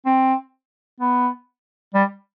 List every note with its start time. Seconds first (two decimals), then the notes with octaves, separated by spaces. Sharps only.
0.06 C4
1.00 B3
1.94 G3